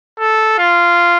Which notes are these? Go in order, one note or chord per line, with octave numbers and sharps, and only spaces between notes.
A4
F4